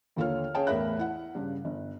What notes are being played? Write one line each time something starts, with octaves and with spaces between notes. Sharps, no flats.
D#2 D3 F4 A4 C#5 F6
C#4 G#4 C#5 F5 G5 A5
E2 A2 A#4 E5 B5 F#6
E4 F#5
G2 C#3
G1